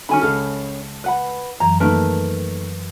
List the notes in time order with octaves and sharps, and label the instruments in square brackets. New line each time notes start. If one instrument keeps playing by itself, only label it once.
[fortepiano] D3 D#3 F#4 [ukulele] C#4 G#5 B5
[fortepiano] C#2 G#4 A4 [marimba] F6
[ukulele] B4 F#5 B5
[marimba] F#2 E3 F#3 [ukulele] A#5
[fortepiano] D#3 A3 A#3 [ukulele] A#4 B4 A5